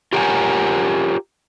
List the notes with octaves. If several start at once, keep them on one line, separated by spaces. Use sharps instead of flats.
F4 G4 A#4 C#5 F#5 G#5